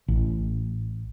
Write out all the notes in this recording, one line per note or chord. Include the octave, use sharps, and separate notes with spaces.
A1